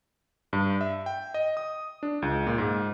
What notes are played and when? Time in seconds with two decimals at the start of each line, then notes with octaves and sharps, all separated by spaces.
0.53 G2
0.81 E5
1.06 G5
1.34 D#5
1.57 D#6
2.03 D4
2.22 C#2
2.47 A#2
2.58 G#2